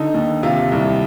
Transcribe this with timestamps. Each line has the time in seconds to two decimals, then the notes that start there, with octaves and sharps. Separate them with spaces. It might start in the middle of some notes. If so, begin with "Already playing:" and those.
Already playing: D3 D#4
0.14 D#2
0.43 C3 F4
0.72 C2